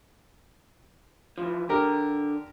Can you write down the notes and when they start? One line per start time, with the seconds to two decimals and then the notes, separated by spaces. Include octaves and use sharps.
1.38 E3 F3
1.69 D3 G4 A#4